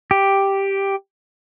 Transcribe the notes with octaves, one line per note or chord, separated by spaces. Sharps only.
G4